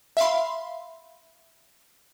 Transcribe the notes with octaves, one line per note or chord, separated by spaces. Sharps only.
E5 F5 B5 C6